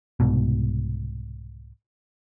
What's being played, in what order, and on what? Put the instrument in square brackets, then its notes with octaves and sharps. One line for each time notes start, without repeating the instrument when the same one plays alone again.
[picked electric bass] C2 G#2 B2